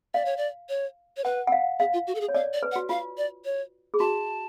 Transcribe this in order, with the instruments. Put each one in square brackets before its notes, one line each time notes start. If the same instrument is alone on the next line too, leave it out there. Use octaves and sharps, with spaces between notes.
[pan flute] D5 [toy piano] F5
[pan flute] C#5
D5
C#5
C#5
[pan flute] B4 [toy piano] F#5
[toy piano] F#5
F5
[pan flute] G#4 [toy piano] F5
[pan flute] F4
F#4
A4
G#4
[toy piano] C#5
[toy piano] D5 [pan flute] F5
[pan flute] D5
[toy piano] B4
[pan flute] F#5
[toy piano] F#4
[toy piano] F4 [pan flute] F5
[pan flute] D5
C#5
[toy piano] G#4
[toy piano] F#4 [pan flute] A5